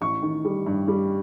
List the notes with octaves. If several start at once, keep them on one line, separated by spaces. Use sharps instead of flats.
A1 C#6
D#3
G3
G2
G3